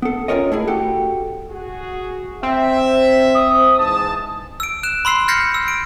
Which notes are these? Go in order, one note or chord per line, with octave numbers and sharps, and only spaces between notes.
B3 A4
C#4 D4 F4 A#4 C#5 D#5
A3 E4 G#4
F#4 G4 A4
F#4 G#4
C4 E5
D#6
G#2 E3 A5
E6 D7
F#6 E7
B5 C6 E6 C7
F6 G6 A6 A#6 C7 C#7
E6
D7